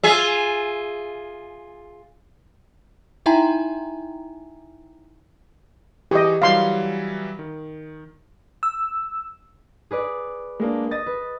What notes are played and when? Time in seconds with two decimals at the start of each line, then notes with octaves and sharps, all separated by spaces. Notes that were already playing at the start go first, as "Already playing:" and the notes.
0.04 F4 G#4 E5
3.26 D#4 E4 E5 G5 G#5 A#5
6.11 E3 G4 G#4 D#5 C#6
6.42 E3 F#3 G3 F5 C6
7.39 D#3
8.63 E6
9.91 G#4 B4 D5
10.60 G#3 A#3 D4
10.91 D#5 A6
11.06 B4